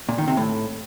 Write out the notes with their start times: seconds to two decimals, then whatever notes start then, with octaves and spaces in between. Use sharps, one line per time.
0.09 A#2
0.18 D#3
0.28 C3
0.37 A2